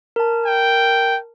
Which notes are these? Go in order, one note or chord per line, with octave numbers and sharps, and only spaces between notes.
A#4 A5
G5